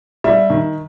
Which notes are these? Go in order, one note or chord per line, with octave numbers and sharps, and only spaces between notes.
G3 E5
D#3